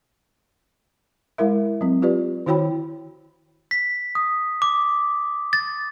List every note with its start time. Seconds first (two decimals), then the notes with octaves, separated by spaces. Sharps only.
1.38 G#3 E4 A#4 E5
1.81 F#3 C4
2.02 F4 G4 B4 D5
2.46 D#3 E4 F#4 C#5 G5 B5
3.71 B6
4.15 D#6
4.62 D6
5.53 A6